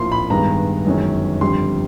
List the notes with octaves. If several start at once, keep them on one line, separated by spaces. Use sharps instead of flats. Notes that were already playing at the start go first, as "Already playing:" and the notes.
Already playing: A#1 A2 F3 A#3 C6
B5
G2 D#3 G#3 B3 A#5
G1 F#2 D#3 G#3 C#4
G1 F2 D3 G3 C6